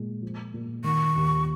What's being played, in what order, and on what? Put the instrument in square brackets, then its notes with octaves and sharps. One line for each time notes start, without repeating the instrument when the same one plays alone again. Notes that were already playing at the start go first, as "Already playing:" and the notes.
Already playing: [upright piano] A#2 G#3
F3
A#2
[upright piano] D#3 [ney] C#6
[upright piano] D#2